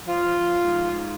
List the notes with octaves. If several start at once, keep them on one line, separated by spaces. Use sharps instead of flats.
F3 F4
F3
F3
G#2
F3
G#2